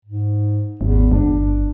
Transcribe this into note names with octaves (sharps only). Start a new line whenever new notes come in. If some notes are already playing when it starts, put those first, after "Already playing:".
G#2
G#1 E2
G1 D4